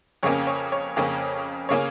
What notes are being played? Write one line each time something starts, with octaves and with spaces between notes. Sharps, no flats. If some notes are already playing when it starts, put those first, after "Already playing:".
F2 C#3 A#3 C#4 C#5
C#5
C#5
F2 C#3 A#3 C#4
C#3 A#3 C#4 C#5